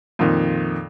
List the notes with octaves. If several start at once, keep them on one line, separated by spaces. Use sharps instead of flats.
F2 A#2 D#3